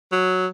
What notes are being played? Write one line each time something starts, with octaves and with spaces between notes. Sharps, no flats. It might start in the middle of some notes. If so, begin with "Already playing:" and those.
F#3